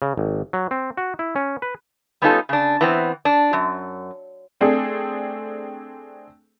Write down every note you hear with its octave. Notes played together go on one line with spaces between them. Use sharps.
C#3
G#1
F#3
C4
F#4
E4
C#4
B4
G3 B3 C#4 D#4 F4 A4
C#3 D4
E3 B3 C4
D4
F#2
A3 C4 D4 G#4 A4